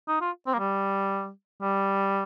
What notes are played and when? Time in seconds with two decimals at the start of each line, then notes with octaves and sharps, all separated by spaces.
0.08 D#4
0.21 F4
0.47 C4
0.54 A#3
0.59 G3
1.61 G3